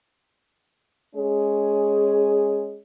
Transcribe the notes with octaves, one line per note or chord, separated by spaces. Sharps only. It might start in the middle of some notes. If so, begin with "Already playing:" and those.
G#3 C#4 G#4